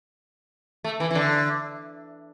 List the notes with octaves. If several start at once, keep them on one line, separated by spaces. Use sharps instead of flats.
A3
E3
E3
D3